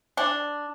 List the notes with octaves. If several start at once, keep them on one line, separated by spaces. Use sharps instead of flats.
D4